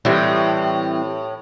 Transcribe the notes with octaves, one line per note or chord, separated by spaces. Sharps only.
A2 E3 G3 C4